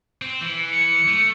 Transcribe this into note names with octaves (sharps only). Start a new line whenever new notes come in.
C4
E3
C#7
A3